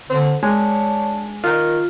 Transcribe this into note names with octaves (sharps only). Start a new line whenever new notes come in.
D3 C4
G#3 D4 C#5
D#3 F4